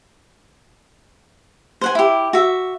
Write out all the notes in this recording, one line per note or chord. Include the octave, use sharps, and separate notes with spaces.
C5 F#5 G#5
E4 G4
F#4 E5